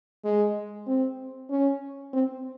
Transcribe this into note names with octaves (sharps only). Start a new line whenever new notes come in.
G#3
C4
C#4
C4